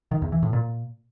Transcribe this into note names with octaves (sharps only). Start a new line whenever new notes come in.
D#3
E2
E3
A2
A#2